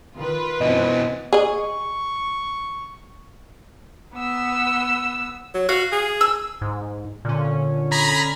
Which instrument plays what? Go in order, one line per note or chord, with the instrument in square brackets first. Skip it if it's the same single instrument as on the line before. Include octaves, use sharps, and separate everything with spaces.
[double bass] D#3 [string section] F4 B4
[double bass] F#2 C4 [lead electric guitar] B2 E3 [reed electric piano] D#5
[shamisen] G#4 D#5 [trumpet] C#6
[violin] B3 E6
[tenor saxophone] F#3
[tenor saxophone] F#4 [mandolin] F5
[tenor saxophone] G#4
[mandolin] E6
[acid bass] G#2
[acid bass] A#2 [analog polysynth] D3 C#4
[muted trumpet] G#4 [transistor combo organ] A#5 B5